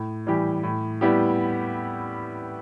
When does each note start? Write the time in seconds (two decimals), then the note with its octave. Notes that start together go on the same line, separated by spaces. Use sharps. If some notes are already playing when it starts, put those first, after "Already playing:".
Already playing: A2
0.27 E3 G3 E4 G4
0.63 A2
1.01 G3 B3 E4 G4